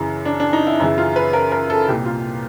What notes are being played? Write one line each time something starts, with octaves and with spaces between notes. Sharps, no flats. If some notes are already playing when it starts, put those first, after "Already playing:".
Already playing: F#2 C#3 E3
D4
D4
D#4
E4
F#2 C#3 E3 E4
F4
B4
A#4
A#4
A4
C2 A#2 G4
F4